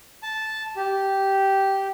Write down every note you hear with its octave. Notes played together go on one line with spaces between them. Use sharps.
A5
G4